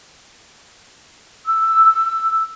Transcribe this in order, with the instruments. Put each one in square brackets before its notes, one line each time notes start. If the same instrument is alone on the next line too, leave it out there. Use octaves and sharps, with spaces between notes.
[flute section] E6